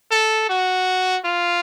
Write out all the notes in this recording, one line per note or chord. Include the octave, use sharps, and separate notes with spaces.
A4
F#4
F4